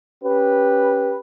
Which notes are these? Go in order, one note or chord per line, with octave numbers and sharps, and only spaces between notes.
C#4 G4 B4